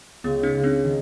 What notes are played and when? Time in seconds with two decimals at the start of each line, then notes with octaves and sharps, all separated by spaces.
0.24 C#2 B3
0.43 C#4 D#4
0.54 C#2
0.63 C4 D4
0.84 D#3